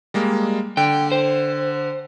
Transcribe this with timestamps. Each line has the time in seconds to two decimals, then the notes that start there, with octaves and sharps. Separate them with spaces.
0.14 G3 G#3 A#3
0.77 D3 G5
1.11 C5